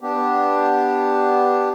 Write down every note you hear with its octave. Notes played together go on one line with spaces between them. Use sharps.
B3 D4 G4